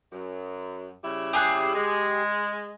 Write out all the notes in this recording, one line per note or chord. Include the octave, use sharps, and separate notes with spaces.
F#2
C#3 G3 E4
G4 G#4 F#6
G#3